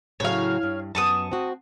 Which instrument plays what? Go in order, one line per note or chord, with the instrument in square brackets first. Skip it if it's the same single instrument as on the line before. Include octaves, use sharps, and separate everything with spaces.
[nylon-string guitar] A2 C#3 F#3 [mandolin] C#5 F5
[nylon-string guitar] G2
[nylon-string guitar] F#2 B3 [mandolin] A5 C#6 D#6
[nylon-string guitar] C4 F#4